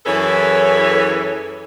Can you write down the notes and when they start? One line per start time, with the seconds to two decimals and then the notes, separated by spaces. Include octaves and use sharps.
0.06 F#2 E3 G#4 A4 B4 C#5